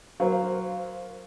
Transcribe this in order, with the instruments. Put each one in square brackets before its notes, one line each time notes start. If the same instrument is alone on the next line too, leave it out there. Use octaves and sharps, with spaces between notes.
[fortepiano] F#3 [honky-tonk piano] A#4 C5 F5